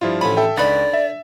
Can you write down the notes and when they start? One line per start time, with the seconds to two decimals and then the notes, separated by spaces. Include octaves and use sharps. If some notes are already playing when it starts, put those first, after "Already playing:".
0.01 G2 F3 E4 F4
0.21 A1 D3 C#4 B5
0.37 A4 E5 G5
0.57 C#2 D3 D#4 B4 D5 B5 A6
0.93 E5